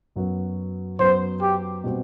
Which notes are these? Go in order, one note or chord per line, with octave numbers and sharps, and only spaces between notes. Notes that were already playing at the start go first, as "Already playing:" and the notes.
F#2 F#3 B3 F#4
F#2 F#3 B3 F#4 C5
G4
B2 G3 C4 F#4